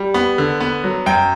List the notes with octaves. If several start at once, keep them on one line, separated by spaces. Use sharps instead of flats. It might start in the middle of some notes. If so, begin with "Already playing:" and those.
Already playing: G3
B3
D3
B3
F#3
F#2 G5